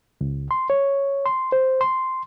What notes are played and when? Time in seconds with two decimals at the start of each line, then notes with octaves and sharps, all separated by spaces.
0.21 C#2
0.51 C6
0.70 C#5
1.26 C6
1.52 C5
1.81 C6